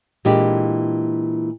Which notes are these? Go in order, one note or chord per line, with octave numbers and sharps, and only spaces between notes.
A#2 E3 G#3 D4 G4